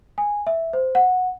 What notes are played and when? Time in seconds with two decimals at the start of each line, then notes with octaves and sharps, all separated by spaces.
0.18 G#5
0.47 E5
0.73 C5
0.95 F#5